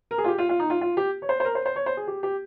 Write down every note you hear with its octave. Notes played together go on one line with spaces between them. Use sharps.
A#4
G#4
F4
G4
F4
F4
D#4
F4
F4
G4
C#5
C5
C5
A#4
C5
C5
C#5
C5
G#4
G4
G4